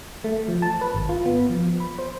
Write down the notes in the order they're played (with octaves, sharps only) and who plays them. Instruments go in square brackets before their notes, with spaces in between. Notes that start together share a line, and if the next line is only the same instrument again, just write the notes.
[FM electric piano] A3
F3
A5
B4
G#1
F4
B3
F3
B5
C5